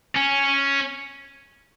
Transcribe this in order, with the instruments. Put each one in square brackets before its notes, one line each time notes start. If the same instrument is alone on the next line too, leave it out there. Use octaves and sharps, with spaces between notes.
[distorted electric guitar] C#4